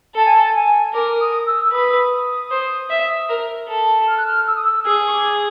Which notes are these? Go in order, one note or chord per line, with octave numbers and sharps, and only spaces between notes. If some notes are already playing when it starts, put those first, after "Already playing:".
A4 A5
G#5
A5
G#5
A#4 D6
D#6
E6
E6
B4 D#6
C5
E5
A#4
A4
F6
F#6
F6
E6
D#6
E6
G#4 D#6
C#6
D6